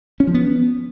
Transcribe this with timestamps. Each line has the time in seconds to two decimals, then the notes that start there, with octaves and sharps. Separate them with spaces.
0.20 C#4
0.27 F3
0.34 B3